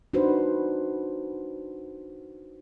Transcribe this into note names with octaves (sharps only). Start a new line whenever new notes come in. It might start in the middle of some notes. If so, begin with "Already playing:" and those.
D4 D#4 F#4 B4 C5